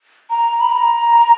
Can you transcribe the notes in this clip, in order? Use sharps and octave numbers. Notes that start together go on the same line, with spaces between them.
A#5
B5
A#5